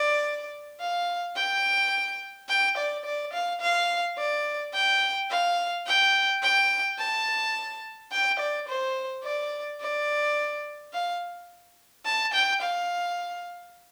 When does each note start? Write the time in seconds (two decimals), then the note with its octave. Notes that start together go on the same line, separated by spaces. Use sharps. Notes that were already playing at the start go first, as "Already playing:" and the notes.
Already playing: D5
0.80 F5
1.36 G5
2.49 G5
2.77 D5
3.05 D5
3.33 F5
3.61 F5
4.18 D5
4.74 G5
5.30 F5
5.87 G5
6.42 G5
6.99 A5
8.12 G5
8.39 D5
8.68 C5
9.24 D5
9.80 D5
10.93 F5
12.06 A5
12.33 G5
12.61 F5